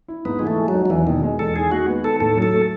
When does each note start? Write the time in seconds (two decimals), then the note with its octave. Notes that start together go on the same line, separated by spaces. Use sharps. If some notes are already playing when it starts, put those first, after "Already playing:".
0.08 E4
0.25 G#2 B3
0.39 E3 G#3
0.47 A3
0.58 G#3
0.68 F#3
0.74 D#4
0.86 F#3
0.90 E2 E3
1.07 B2 D#3
1.23 G#3
1.39 E2 A4
1.56 D#3 G#4
1.72 G#3 F#4
1.88 B3
2.04 D#3 A4
2.20 A2 A4
2.37 F#3
2.42 A4
2.53 A3